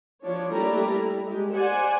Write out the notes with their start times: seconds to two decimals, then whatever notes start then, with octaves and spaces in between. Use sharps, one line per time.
0.22 F3 D4 C#5
0.50 G3 A3 A#3 D4 E4 A#5
0.93 E4
1.25 G#3 G4
1.54 C5 D5 F#5 G#5